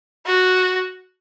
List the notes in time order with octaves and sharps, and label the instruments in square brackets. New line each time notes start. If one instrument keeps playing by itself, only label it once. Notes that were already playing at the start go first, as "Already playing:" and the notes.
[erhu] F#4